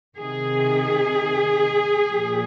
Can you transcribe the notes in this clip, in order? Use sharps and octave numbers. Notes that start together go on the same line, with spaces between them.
C3 D#3 G#4
A#2 F3